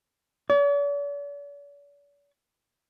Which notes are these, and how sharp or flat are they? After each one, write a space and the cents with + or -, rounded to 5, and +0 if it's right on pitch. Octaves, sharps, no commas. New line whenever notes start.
D5 -45